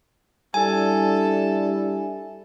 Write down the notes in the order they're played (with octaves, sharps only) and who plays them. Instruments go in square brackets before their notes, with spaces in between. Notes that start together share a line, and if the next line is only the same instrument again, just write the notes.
[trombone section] G3 D4 E4 [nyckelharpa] A4 [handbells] G#5